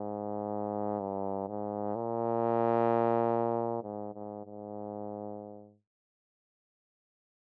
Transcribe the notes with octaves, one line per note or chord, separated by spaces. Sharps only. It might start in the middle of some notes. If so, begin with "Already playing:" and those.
Already playing: G#2
G2
G#2
A#2
G#2
G#2
G#2